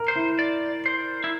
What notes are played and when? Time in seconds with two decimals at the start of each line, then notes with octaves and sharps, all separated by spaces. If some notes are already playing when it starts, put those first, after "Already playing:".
Already playing: A#4
0.08 C5
0.16 E4
0.39 D5
0.86 C5
1.24 E4